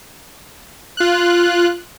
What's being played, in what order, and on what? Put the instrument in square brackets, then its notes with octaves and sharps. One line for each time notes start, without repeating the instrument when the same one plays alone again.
[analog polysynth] F4 F#6